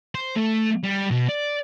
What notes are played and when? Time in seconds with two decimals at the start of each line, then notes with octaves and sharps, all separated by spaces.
0.15 C5
0.36 A3
0.84 G3
1.11 B2
1.29 D5